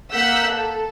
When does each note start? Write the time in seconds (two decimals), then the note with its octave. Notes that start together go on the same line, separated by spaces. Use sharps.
0.12 A#3 F#5 E6 F#6 G6 B6
0.48 A4